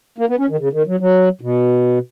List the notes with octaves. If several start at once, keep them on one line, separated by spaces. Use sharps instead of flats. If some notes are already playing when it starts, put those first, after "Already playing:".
A#3
B3
C#4
D#3
C#3
D#3
F#3
F#3
B2